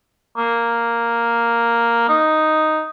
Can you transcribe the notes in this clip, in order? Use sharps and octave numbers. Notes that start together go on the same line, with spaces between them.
A#3
D#4